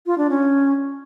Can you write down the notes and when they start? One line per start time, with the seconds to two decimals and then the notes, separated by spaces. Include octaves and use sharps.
0.06 F4
0.18 D4
0.29 C#4